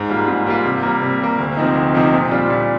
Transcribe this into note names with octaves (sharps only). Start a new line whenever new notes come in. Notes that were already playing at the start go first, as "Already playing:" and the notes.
Already playing: G#2
G3 A#3 F4
G#2
G3 A#3 F4
C3
G3 A#3
C3
G3 A#3
D2
C3 F3 C4 D#4
D2
C3 F3 C4 D#4
A#2
G3 D4 F4
A#2